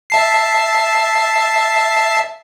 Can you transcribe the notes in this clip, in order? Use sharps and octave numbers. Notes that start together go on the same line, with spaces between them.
E5 A5 C7